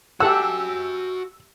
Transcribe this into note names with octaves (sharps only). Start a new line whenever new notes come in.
F#4 G4 A4 F#5 G#5 E6